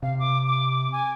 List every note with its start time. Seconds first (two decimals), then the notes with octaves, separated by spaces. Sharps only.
0.03 C3 F5
0.19 D6
0.47 D6
0.92 G#5